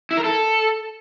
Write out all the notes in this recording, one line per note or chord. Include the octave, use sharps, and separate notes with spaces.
E4
A#4
A4